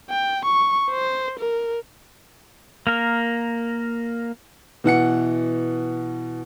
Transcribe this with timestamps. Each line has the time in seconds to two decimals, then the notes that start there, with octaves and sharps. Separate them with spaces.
0.11 G5
0.45 C#6
0.91 C5
1.39 A#4
2.87 A#3 A#4
4.84 B2 E3 F#5 C#7